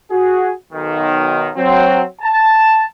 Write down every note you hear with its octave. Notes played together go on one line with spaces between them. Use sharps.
F#4 G#4
B1 D#3
F#3 C4
A5